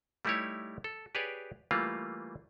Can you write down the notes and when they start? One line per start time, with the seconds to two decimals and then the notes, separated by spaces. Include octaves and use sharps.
0.25 G3 A3 D#4 E4 G4 C#5
0.84 A4
1.15 G4 G#4 B4 C#5 D5
1.71 E3 G3 A3 A#3 F4